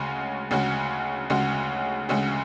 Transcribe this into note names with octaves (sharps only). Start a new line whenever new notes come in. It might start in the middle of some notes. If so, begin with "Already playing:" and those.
Already playing: D2 C#3 G#3 C#4 F#4
D2 C#3 G#3 C#4 F#4
D2 C#3 G#3 C#4 F#4
D2 C#3 G#3 C#4 F#4